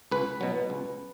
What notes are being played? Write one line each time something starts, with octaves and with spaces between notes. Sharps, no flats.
C#2 B4
B2 F#3
C#2